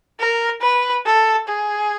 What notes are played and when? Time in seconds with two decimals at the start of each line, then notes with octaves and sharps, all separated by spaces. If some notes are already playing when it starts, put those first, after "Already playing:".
0.19 A#4
0.62 B4
1.05 A4
1.48 G#4